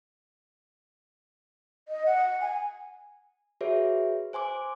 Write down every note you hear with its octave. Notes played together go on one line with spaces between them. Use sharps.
D#5
F#5
G#5
F#4 G#4 B4 C#5 E5
C5 G#5 C6 D6